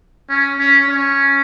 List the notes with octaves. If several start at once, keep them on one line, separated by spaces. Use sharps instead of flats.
C#4
C#4
C#4